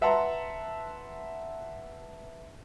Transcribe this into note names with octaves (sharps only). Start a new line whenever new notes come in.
B4 E5 F#5 A5 A#5 C6